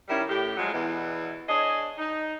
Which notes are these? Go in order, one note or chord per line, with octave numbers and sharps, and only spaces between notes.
D#3 G3 C#4 E4
A2 G4
F3 F#3 G#3
E2 B2 E3
D4 G#4 C#5 D#5
D#4